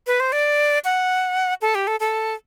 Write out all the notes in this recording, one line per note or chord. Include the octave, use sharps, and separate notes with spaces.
B4
C5
D5
F#5
A4
G4
A4
A4